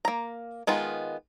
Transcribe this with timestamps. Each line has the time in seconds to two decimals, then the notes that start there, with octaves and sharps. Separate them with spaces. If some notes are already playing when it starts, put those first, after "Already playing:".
0.05 A#3 A#5
0.67 D#3 G#3 B3 F4